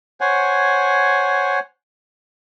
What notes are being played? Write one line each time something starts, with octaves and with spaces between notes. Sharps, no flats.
C5 C#5 F#5 G#5